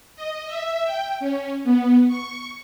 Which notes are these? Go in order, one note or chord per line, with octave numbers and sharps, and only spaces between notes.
D#5
E5
G5
C#4
B3
C#6